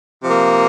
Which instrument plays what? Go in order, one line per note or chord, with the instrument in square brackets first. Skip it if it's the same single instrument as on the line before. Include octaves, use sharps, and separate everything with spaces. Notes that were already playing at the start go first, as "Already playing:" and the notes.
[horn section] C3 F3 A#3